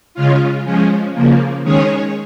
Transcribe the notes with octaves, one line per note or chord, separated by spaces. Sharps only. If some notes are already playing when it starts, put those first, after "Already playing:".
C#3 G#3 C#4 F4
F3 G#3 C#4
C#3 F3 A#3
D#3 G#3 C#4 G#4 C#5